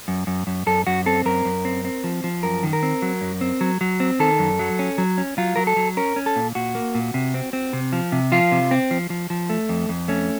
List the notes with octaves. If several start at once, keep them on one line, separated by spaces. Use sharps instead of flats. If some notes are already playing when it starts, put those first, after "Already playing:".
F#2
F#2
F#2
F#2 A4
F#2 F#4
C4 A4
F#2 A#4
F#2
C4
C4
F3
F3
F#2 A#4
D#3
A#4
C4
F#3
F#2
C4
F#3
F#3
C4
D#3 A4
F#2
F#3
C#4
F#3
C#4
F#3 F4
F#3 A#4
A4
F#3
C#4 A#4
C#4
A4
A#2
A#2 F#4
A#3
A#2
C3
C4
C4
C3
F3
C3
F3 F4
C3
C4
F3
F3
F3
A3
F2
F2
A3 C#4